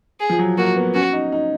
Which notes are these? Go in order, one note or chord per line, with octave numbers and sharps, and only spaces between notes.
G#4
F3
F#3
A#3 F#4
B3
C#4 F#4
D#4
D#4